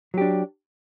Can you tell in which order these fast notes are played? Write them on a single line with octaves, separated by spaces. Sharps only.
F#3 G4 D4